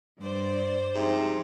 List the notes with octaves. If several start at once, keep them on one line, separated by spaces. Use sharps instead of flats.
G2 C5 D5
G#2 C3 F3 G3